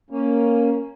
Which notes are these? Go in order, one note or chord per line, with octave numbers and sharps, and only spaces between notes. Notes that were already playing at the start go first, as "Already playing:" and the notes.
A#3 C#4